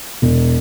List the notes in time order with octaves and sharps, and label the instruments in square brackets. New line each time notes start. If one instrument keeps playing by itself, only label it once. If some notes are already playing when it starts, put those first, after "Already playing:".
[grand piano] E1